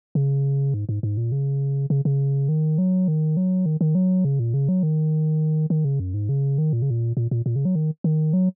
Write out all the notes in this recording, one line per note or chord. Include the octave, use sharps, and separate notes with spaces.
C#3
G#2
G#2
G#2
A#2
C#3
C#3
C#3
D#3
F#3
D#3
F#3
D#3
D#3
F#3
C#3
A#2
C#3
F#3
D#3
D#3
C#3
F#2
G#2
C#3
D#3
A#2
C#3
A#2
A#2
A#2
A#2
C#3
F#3
D#3
D#3
F#3